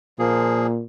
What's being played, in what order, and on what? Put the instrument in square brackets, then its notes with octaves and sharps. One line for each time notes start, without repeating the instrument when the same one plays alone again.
[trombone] A#2 [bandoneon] F3 A#3 G#4